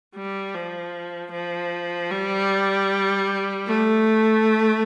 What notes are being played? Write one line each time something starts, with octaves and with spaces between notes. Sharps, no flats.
G3
F3
F3
G3
A3